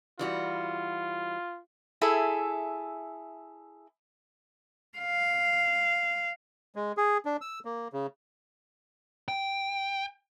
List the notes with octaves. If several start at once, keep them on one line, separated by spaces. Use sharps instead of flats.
E3 G3 F4 F#4
E4 G#4 A4 E5
F5
G#3
G#4
D4
E6
A#3
C#3
G5